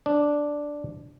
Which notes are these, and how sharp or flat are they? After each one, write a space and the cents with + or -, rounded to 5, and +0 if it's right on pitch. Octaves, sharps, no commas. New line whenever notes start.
D4 +0 D5 +0